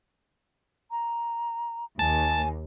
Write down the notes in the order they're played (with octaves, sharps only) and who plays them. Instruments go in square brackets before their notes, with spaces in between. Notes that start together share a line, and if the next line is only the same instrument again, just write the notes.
[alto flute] A#5
[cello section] D#2 [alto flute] G#5 [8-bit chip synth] A5